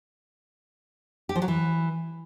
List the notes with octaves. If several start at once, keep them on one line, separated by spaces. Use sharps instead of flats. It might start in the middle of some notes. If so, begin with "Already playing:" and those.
G4
F3
F#3
E3